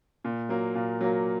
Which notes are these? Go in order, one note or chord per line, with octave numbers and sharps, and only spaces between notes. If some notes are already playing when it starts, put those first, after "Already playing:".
A#2
F#3 A#3
A#2
F#3 A#3